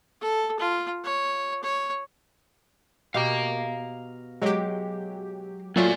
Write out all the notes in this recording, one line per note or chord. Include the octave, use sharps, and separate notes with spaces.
A4
F4
C#5
C#5
B2 G4 F5 A#5
F#3 G#3 G4
F#3 A3 A#3 F4 D5 G#5